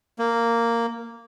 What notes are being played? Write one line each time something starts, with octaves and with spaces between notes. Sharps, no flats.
A#3